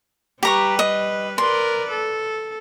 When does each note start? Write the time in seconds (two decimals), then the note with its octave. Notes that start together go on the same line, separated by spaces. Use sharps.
0.43 G3 G4 B4 A#5 C#6
0.79 D#5
1.38 A#4 B4 D5 C6
1.90 A4